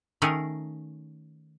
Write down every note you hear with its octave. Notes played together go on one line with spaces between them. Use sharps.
D#3 A3 C#4 G#4 A#4